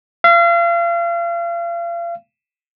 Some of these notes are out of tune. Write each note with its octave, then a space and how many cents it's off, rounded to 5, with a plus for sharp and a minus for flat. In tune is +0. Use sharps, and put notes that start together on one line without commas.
F5 -35